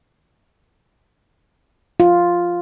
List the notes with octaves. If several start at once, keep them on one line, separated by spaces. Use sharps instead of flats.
F4